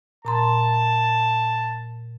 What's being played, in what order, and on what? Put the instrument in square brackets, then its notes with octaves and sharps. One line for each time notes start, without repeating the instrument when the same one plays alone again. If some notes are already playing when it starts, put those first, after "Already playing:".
[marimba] A#2 A#5 C6 [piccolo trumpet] A5